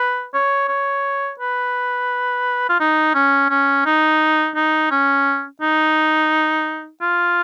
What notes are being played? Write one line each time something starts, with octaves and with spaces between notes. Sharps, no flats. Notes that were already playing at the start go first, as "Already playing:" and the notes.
Already playing: B4
C#5
C#5
B4
F4
D#4
C#4
C#4
D#4
D#4
C#4
D#4
F4